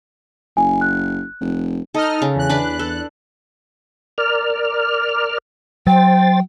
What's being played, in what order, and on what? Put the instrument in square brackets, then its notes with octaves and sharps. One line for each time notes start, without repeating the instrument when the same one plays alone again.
[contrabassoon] F#1 [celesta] G#5
[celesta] F#6
[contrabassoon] F1
[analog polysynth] D#4 D#5 F6 [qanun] A4
[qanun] C#3
[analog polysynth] E2 F#6
[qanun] D4 B4 D5
A4
[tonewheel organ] A#4 D5 F6
[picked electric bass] F#3 [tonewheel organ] C5 A6 [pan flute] G5